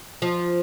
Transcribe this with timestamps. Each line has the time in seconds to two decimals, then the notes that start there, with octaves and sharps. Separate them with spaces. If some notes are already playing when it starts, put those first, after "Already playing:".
0.22 F3